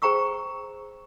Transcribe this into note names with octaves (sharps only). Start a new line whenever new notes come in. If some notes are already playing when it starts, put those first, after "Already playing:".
G#4 C5 G5 A#5 C#6 E6